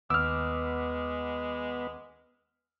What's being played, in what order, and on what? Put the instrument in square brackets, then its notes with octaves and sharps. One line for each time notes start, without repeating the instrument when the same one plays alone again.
[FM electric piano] D#2 F#5 D6 [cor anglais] G#3 [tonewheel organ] B3 [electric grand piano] E6 F6